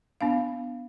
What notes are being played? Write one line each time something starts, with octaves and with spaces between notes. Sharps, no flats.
B3 D4 F5